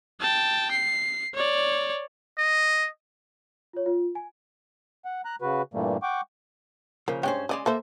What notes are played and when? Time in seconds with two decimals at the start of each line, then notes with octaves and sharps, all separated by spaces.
0.21 G5 A5
0.71 C7
1.34 C#5 D5
2.38 D#5
3.73 F4 C#5
3.86 F4
4.15 G#5
5.05 F#5
5.25 A#5 F#6
5.42 C#3 F#4 B4
5.74 G2 A#2 E3 G3 A3 A#3
6.03 F#5 G5 C#6 D6
7.08 C#3 F3 A#3
7.23 G2 G#3 C#4 C5 C#5 G5
7.49 C#3 G#3 G#4 D5 D#5
7.66 A#3 A4 C5 E5